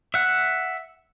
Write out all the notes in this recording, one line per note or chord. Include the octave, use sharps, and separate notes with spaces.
E5 F#5